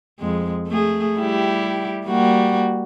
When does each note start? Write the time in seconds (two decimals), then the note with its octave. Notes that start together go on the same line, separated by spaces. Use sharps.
0.20 F2 G#3
0.68 A3 G#4
1.18 G3 E4 G4
2.06 G3 A#3 F#4